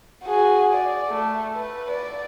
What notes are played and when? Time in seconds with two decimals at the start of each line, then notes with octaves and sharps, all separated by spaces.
0.24 F#4 G#4
0.73 D5
1.09 A3
1.55 B4
1.91 D5